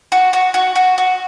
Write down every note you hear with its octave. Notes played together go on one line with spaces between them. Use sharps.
F#4
F#4
F#4
F#4
F#4